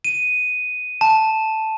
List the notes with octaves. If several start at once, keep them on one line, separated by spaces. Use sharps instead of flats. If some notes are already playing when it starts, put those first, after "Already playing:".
D#7
A5